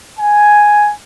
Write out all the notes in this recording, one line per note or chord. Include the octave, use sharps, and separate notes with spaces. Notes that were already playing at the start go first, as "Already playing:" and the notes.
G#5